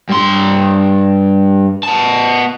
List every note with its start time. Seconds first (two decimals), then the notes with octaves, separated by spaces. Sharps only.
0.09 G2 C6
1.83 B3 A5